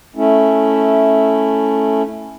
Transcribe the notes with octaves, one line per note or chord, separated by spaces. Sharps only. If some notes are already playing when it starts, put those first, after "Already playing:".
A3 C#4 E4